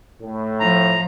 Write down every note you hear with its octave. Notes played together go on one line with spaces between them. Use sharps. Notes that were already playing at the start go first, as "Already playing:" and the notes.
A2
F3 A#5